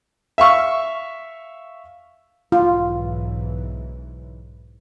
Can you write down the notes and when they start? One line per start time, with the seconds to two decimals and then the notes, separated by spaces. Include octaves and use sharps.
0.38 E5 F5 C#6 E6
2.52 B1 G#2 E3 F4